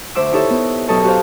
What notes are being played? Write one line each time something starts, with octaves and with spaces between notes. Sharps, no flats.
D2 C5 E5 D6 E6
D#4 E4 G4 A4 C#5 E5
B3
F#2 B2 A4 D#5 A5 C#6
F#4 G4 C5 F5